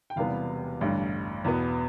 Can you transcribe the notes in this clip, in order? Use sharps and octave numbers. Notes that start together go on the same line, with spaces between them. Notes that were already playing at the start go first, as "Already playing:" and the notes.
G5
E1 E2 C3 G3 B3 F5
A1 G2 D3
E2 B2 B3